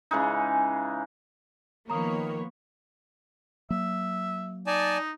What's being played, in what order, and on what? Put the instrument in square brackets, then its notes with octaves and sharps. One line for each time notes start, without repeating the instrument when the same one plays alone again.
[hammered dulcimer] C#3 E3 G#3 D#4
[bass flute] D#3 [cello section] F3 B3 C#5 [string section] A#3 [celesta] A#5 D#6
[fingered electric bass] F#3 A#3 [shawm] E5
[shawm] D#4 [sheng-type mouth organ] D5 G#5 A5